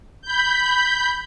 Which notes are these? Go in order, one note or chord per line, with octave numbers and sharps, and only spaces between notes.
B5 G6